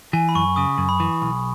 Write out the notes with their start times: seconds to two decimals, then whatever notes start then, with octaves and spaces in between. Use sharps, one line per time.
0.13 E3 G#5
0.29 B5
0.35 F#2 C#6
0.56 C#3 D#6
0.78 F#2
0.89 B5
1.00 E3
1.22 B1